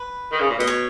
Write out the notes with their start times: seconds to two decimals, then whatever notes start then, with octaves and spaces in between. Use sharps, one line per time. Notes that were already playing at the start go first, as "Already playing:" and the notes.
Already playing: B4
0.32 D#3
0.40 C#3
0.50 A#2
0.58 B2 D#5
0.67 C#5